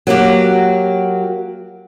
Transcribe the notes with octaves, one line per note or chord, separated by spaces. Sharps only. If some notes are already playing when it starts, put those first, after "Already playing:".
F#3 A#3 F#4 G4